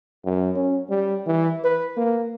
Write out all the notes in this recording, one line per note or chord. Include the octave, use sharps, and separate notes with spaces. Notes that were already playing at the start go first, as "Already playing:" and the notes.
F#2
C#4
G3
E3
B4
A#3